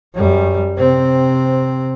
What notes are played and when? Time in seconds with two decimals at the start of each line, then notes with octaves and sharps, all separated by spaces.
0.15 F#2 G3
0.78 C3 C4